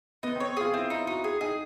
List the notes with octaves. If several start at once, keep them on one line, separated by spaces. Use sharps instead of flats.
B3 D#4
C4
C#5
F4 G#4
C4 E4
D#4
D#4 F#4
G#4
D#4 G#4